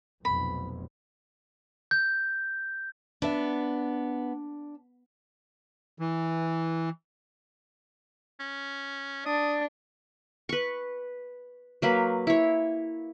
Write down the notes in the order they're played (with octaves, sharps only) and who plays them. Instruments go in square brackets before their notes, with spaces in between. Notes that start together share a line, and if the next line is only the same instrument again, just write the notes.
[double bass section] F1 B1 F2 [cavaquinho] B5
[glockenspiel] G6
[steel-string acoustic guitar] B3 [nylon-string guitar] D4 E5
[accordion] E3
[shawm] C#4
[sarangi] D4 [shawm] D#6
[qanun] B4 C#6
F#3 A#3 B4
E4 C#5